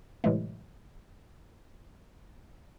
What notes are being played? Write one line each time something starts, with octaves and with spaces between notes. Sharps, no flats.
A2 C3 E3 F#3 G#3 A3